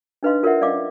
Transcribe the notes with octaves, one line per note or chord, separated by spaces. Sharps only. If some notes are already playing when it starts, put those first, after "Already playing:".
D4 D#4 B4 D#5 F5 C6
F4 A#4 C#5 D5 E5 F#5
C#4 D5 D#5 F5 D6